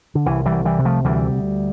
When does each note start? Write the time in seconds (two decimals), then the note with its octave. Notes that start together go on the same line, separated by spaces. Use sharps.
0.15 D3
0.26 C2 E3
0.46 E3 G3
0.52 C2
0.65 E3 G3
0.79 C3
0.85 F3 A3
1.04 D2 E3 G3
1.32 D2